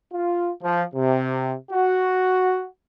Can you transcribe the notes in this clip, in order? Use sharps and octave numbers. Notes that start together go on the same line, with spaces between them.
F4
F3
C3
F#4